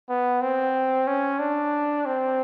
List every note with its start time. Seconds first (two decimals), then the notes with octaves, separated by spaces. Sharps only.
0.09 B3
0.41 C4
1.07 C#4
1.39 D4
2.06 C4